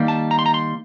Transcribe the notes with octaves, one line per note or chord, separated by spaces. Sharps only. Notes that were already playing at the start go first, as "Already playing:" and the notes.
Already playing: D#3 G3 A#3
A5
A#5
C6
A#5
C6